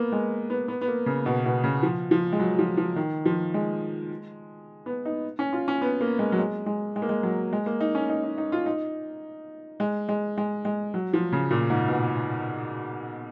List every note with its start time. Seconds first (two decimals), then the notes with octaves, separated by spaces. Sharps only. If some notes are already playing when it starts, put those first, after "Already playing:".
Already playing: A#3 B3
0.12 G#3
0.50 B3
0.68 B3
0.81 B3
0.88 A#3
1.06 C#3
1.26 B2
1.45 B2
1.64 C#3
1.83 F3
2.11 F3
2.32 G#3
2.40 F#3
2.59 F3
2.77 F3
2.96 D#3
3.26 F3
3.54 G#3
4.86 B3
5.05 D#4
5.39 C#4
5.53 F4
5.68 C#4
5.82 B3
6.01 A#3
6.19 G#3
6.32 F#3
6.39 G#3
6.66 G#3
6.96 G#3
7.02 A#3
7.09 G#3
7.23 F#3
7.53 G#3
7.66 A#3
7.80 D#4
7.95 C#4
8.09 D#4
8.24 D#4
8.38 D#4
8.52 F4
8.66 D#4
9.80 G#3
10.09 G#3
10.38 G#3
10.65 G#3
10.94 F#3
11.13 F3
11.32 C#3
11.51 A#2
11.70 G#2
11.88 B2